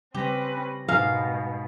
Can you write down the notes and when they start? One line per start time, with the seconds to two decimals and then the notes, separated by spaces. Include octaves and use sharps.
0.14 C#3 G3 C4 C#4 G4 B4 A#6
0.88 G#2 B2 A#4 F5